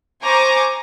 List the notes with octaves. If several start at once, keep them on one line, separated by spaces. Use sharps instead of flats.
C5 G#5 A#5 C#6 D6